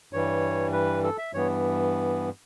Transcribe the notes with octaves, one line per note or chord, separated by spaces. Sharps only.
G2 E3 G3 C#5
B4
A4
E5
G2 E3 B3 C#5